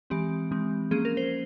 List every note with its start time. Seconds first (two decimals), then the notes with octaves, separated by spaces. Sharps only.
0.10 E3 G#3 C4 G4
0.51 E3 G#3 C4
0.91 F3 A#3 C#4 G#4
1.05 A#4
1.17 C5